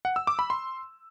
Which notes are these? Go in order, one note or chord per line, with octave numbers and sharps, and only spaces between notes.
F#5
E6
D6
B5
C6